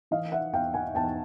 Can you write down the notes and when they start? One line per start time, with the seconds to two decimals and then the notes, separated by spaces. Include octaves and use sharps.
0.11 E3 D#5 F5
0.32 E5 F#5
0.53 E2 F5 G5
0.74 F#5 G#5
0.95 E2 G5 A5